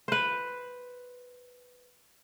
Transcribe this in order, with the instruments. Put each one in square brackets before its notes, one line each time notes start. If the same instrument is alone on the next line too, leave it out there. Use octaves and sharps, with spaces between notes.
[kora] B4 C5